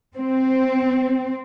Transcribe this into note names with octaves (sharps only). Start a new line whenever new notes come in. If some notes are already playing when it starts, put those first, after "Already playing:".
C4